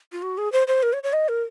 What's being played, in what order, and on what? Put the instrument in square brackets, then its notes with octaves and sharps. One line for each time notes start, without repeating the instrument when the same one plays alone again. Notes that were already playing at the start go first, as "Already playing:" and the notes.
[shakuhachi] F4
F#4
G#4
C5
C5
A#4
C#5
C#5
D#5
A#4